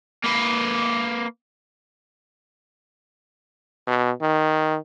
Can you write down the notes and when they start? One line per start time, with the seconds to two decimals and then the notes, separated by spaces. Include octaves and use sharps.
0.24 A#3 B4
3.87 B2
4.22 D#3